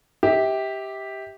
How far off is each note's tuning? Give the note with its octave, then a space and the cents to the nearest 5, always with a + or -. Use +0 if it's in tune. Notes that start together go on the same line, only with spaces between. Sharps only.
G4 +0 E5 -30